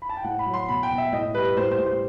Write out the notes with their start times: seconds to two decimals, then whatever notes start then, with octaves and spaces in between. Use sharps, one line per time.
0.02 B5
0.09 A5
0.17 G5
0.24 A2 F#5
0.39 B5
0.46 F#3
0.54 C6
0.68 B2 B5
0.83 G5
0.91 B2
0.98 E5
1.12 A2 D#5
1.34 G3 B4
1.57 A2 C5
1.71 C5
1.79 A2
1.86 C5